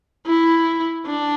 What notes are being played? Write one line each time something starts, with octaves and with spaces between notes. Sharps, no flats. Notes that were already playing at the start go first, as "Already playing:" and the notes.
E4
D4